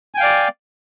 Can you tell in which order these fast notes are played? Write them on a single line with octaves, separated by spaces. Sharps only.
G#5 G5 F5 D5